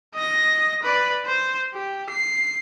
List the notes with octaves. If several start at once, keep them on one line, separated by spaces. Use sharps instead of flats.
D#5 A#6
B4 D5
C5
G4
C7